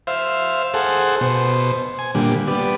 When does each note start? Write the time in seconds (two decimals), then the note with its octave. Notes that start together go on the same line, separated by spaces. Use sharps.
0.07 C5 E5 F5
0.74 G#4 A4 C5 F#5
1.21 B2 C5
1.99 G#5
2.15 A#2 D3 G3
2.48 G3 B3 D5